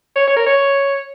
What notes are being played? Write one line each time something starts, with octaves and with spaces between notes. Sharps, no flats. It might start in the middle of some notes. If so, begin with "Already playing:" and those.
C#5
C#5
A#4
C#5